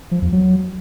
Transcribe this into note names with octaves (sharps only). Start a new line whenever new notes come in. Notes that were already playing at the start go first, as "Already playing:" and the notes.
F3
E2
F#3